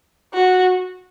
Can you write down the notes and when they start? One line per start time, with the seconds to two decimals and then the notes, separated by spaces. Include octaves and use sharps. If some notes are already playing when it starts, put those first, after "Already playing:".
0.34 F#4